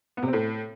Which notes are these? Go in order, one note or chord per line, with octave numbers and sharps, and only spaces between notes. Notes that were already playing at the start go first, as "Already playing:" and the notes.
B3
C3
C4
A2